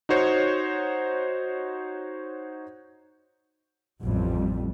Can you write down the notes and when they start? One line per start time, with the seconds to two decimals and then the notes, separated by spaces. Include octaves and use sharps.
0.09 D#4 F#4 C5 C#5
4.04 A1 F2 G3